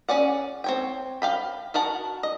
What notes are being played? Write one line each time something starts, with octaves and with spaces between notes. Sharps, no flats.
C#4 G#4 D5 F#5
C4 C#5 G5
F5 G5 B5
F#4 A#4 F#5 A5
D#5